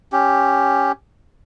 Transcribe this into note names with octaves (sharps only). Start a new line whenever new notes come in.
C#4 G4